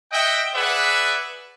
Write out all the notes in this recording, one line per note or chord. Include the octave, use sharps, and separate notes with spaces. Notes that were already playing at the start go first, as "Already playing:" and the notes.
D#5 E5 F#5 G5
G#4 B4 D5 E5 F#5